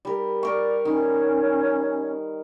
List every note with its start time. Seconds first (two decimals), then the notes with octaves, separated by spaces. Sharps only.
0.05 G3 A#4
0.43 A#4 D5 C#6
0.85 D#3 C#4